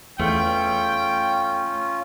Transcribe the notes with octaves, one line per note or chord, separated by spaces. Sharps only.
E2 A3 C#4 F4 G5